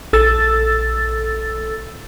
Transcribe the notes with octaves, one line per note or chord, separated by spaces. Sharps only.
A#1 A4 E6 A6